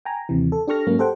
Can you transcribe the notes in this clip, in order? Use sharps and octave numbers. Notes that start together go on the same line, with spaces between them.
G5 G#5 A#5
D#2 C3 E3
A4
D4 G4 A4 C#6 F6 A#6
G#2 F#3 A#3 C#4
G4 A4 C5 F#5 G5